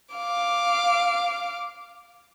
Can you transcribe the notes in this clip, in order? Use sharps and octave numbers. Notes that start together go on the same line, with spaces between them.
F5 D6